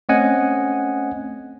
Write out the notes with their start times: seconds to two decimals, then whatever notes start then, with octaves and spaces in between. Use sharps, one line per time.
0.09 A3 C4 C#4 D#5 F#5 G#5